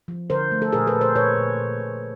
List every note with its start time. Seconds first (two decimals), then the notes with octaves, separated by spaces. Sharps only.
0.08 F3
0.30 D3 A#4 C5
0.52 A3
0.62 A4
0.72 A#2 G#4 A#4
0.87 A4 B4
0.95 A#2
1.01 A#4 C5
1.15 A#2 B4 C#5
1.37 A#2
1.59 A#2
1.80 A#2